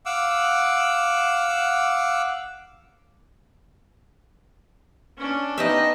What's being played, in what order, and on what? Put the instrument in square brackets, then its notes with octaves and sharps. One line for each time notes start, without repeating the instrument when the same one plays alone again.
[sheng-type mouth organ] F5 F#5 D6 E6
[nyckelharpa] C#4 D4
[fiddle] B3 D#5 [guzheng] D#4 G4 E5